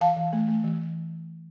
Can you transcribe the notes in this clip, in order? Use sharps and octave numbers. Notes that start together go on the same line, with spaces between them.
E3 F5 A5
E3
A3
A3
E3